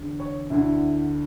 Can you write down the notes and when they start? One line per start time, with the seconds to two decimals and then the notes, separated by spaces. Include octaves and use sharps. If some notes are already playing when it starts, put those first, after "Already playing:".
Already playing: E2 D3
0.20 C#5
0.50 D2 D3 E4